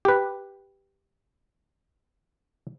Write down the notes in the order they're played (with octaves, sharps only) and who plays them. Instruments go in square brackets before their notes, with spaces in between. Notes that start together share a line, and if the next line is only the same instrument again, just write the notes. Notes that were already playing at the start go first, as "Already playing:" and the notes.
[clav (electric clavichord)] G4 B4